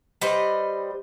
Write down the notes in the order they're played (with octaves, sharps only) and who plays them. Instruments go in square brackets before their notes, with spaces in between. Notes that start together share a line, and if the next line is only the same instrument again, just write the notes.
[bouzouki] G3 B4 C5 D#5